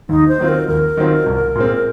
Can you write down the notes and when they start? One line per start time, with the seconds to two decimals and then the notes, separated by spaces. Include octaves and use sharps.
0.09 D#2 D#4
0.28 C5
0.39 D#3 F#3 C4 F4
0.48 A#4
0.68 D#2 A#4
0.97 D#3 F#3 C4 F4
1.26 C2
1.55 A#2 G#3 C4